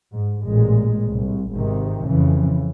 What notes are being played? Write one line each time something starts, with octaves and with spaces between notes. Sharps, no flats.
G#2
A1 A#2 G#3
C2
G#1 G#2 C3 D#3
F2 C#3 E3